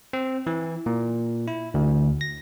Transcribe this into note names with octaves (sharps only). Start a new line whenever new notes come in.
C4
E3
A#2
E4
D2
A#6